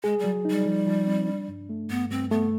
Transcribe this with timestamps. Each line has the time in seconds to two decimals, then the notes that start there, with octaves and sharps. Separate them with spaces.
0.04 G#3 G#4
0.19 F#3 G3
0.45 D#4
0.50 G3
0.65 F3
0.87 F3
1.07 C4
1.28 D4
1.48 G2
1.69 A3
1.90 G2 B3
2.11 G2 C4
2.31 A3 B3